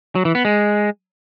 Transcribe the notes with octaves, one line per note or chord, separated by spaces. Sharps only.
F#3
E3
B3
G#3